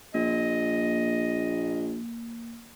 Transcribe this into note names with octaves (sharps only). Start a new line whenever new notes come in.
A#1 A#3 D#5